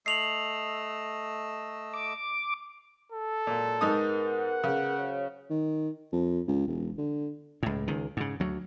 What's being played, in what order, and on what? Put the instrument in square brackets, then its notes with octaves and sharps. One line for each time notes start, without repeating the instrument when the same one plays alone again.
[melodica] A3 D#5 E6 [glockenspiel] C7 F7 F#7
[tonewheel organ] D6
[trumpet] A4
[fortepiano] A#2 [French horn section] F#3 G#3 A#3
[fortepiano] G#2 D#4 D#6 [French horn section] B3 G#4 A#4
[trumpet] F#5
[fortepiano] C#3
[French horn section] F#3 C5 C#5
[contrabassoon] D#3
F2
C#2
E1
D3
[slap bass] C#2 A2
C#2 D#3
G#2 C#3
D2 F#3